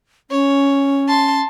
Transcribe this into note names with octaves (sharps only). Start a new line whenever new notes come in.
C#4 C#5
A5 C6